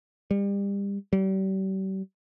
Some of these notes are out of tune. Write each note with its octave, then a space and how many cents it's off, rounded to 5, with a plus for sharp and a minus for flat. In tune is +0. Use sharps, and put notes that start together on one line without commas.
G3 +30
G3 -40